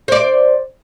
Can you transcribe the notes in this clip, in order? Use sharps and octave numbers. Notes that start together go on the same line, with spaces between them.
C5 D5